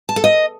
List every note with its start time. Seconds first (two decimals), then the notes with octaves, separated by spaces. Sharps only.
0.09 A5
0.16 A4
0.24 D#5